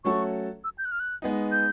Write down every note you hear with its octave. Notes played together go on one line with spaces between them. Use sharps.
F#3 A3 C#4 F#4 A4 C#6
E6
G6
F#6
F6
F#6
G#3 B3 D#4
G6